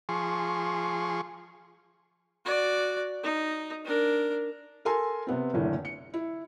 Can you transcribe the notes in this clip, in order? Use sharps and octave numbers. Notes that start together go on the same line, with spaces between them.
F3 G#4 C6 C#6
F#4 D5
D#4
D4 A#4
A4 A#4 G#5 C6
C3 B3 C4
F#1 A2 D3 E3
C#7
E4